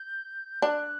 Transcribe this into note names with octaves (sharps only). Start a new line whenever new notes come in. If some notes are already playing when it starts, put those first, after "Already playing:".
Already playing: G6
D4 F#6